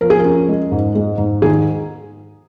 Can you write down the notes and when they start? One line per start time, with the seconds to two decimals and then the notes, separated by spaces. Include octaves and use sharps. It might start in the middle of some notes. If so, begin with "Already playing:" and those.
0.01 F3 A#4
0.10 G#4
0.19 A#4
0.25 C#4
0.49 G#3
0.72 G#2
0.95 G#3
1.18 G#2
1.42 D#3 G#4